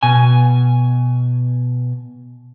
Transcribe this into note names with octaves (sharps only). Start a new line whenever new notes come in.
B2 G#5